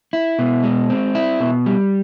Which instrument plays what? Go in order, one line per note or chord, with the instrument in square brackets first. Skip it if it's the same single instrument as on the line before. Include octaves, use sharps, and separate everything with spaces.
[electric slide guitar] E4
B2
G#3
C4
E4
B2
G3